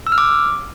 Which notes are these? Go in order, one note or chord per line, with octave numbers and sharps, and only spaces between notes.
E6
F6
D6